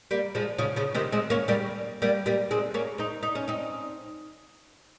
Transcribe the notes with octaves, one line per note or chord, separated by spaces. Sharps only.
G3 A#3
F3 G#3
C#3 F3
C#3 F3
C3 D#3
G#3 C4
A#3 C#4
G3 A#3
G3 A#3
G3 A#3
G#3 C4
A#3 C#4
C4 D#4
D#4
C#4
C4 D#4